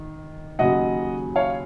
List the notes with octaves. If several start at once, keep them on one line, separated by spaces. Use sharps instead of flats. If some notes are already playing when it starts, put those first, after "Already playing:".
Already playing: D#3
D#2 C#3 F#3 D#5 F#5
C#5 F5